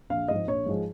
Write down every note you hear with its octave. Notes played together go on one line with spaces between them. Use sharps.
A#1 F5
G#2 F3 G#3 D#5
A#1 C#5
G#2 F3 G#3